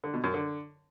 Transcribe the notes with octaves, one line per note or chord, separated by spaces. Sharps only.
D3
B2
F#2
D3